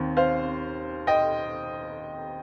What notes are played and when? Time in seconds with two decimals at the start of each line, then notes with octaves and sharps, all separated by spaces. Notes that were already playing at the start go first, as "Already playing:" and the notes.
Already playing: D#2 D#3 C4
0.17 C5 F5
1.07 D#5 G5